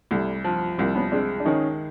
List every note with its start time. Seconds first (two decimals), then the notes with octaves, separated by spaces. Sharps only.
0.11 C2 G3 A3
0.44 F3
0.78 C2 A#3 C4
0.95 B3 C#4
1.12 G#3 C4 D4
1.40 D4
1.45 D#3 C#4 D#4